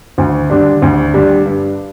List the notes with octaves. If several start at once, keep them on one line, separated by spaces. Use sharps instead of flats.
D2
D3 G3 D4
D2
D3 G3 D4
G2